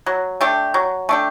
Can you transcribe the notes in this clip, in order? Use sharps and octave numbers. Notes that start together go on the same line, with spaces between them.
F#3
A3 D4 G4
F#3
A3 D4 G4